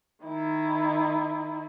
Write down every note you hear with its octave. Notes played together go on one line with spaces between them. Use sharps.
D#3 E4